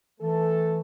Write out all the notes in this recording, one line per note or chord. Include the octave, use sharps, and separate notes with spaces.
E3 A3 A4